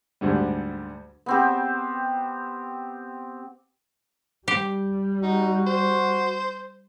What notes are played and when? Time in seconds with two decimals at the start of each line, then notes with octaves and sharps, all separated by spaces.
0.21 D2 G#2 D3 G3
1.26 B3 C4 G4
4.48 G3 G4
5.23 D#4 F#4
5.66 C5